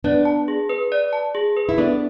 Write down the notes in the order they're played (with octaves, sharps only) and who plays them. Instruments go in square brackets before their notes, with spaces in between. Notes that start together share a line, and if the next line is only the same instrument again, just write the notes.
[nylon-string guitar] B3 D4 [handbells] D5
[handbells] A5
G#4
B4
D5
A5
G#4
B4
[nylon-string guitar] E4
[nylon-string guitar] B3 D4 [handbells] A4